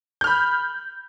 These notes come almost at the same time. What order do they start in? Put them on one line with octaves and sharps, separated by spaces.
G6 F6 B5